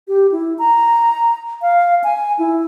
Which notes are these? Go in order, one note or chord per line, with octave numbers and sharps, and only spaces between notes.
G4
E4
A#5
F5
G#5
E4